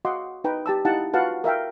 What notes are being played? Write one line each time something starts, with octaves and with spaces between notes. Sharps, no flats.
F#4 D#5 F5 F#5 C6 D6
D#4 B4 G5 A#5
G4 A5 E6
D#4 E4 G4 F5 F#5 A5
F4 F#4 B4 F5 F#5 A5
A#4 E5 F5 G5